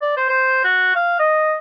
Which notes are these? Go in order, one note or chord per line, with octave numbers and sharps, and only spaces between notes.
D5
C5
C5
F#4
F5
D#5